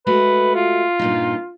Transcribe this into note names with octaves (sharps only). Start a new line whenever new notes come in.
G#3 A3 F#4 B4
F4
G2 A#2 D#4